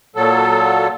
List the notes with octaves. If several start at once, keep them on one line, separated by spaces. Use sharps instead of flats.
A#2 F#3 A4